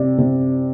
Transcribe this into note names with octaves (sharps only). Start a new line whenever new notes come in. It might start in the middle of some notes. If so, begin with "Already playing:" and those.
Already playing: C3 D5
C3